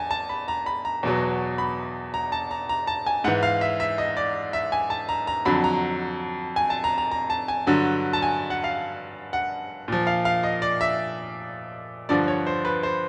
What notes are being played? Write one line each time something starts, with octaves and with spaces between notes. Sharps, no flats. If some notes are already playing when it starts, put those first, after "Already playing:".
Already playing: E2 G#5 A5
A5
B5
A#5
B5
A#5
E2 B2 F#3
B5
A#5
A5
A#5
A#5
A5
G#5
G#2 E3 F#5
F5
E5
E5
D#5
D5
E5
G#5
A5
A#5
A#5
F2 D3 F#3 B5
A#5
G#5
A5
A#5
A#5
A#5
A5
G#5
G2 D3 F#3
A5
G#5
F#5
F5
F#5
A#2 F3
F5
F5
D#5
D5
E5
G2 D3 F3 D5
C#5
C5
B4
C5